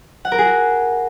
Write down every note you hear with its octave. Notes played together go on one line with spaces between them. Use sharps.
F#5
A#4
G#4
F#4